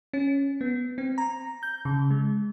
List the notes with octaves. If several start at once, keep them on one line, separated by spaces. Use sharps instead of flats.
C#4
B3
C4
A#5
G6
C#3
G#3